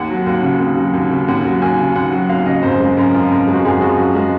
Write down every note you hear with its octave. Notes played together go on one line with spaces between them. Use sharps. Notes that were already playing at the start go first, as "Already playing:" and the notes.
Already playing: D#2 F#5
F#3
D#2 F#5
C#3
D#2
F#3
D#2
C#3
D#2 F#5
F#3
D#2 G#5
C#3
D#2 F#5
F#3
D#2 F5
C#3 D#5
F#2 C5
G#3
F#2 A#4
F3
F#2 A#4
G#3
F#4
F#2 G#4
F3 F#4
F#2
G#3